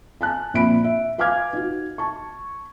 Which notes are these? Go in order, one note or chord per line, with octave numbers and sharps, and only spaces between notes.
G#5 A5 F#6
A#1 A#2 C4 E5 B5 D7
E5
B4 F5 G#5 D6 F6 G#6
D#4 F#4
A5 C#6